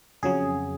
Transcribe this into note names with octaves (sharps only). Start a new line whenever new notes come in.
F2 C#3 F#3 G#4